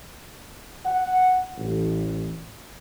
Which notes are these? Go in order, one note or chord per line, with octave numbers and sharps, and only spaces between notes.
F#5
A1